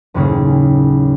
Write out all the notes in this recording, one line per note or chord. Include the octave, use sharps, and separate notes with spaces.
F#1 D#2 A2 C#3 C#4 G#4